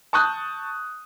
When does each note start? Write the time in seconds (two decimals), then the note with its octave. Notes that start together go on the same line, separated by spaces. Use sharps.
0.13 A5 C#6 D#6 F#6 G6